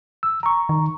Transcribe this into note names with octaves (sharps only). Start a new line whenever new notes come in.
E6
A#5 C#6
D#3